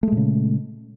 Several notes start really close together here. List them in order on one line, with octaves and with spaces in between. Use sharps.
A3 G#3 A#2 C#3